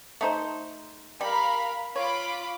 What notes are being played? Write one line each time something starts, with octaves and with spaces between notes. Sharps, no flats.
A3 D#4 C5
G3 A#4 F5 B5
F4 C#5 B5 D6